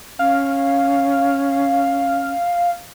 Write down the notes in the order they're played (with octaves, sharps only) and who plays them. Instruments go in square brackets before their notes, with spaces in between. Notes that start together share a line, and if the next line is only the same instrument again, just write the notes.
[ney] C#4 [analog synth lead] F5